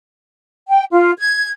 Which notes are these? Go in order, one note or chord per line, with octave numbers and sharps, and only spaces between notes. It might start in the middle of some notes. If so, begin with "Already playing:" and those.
G5
F4
G#6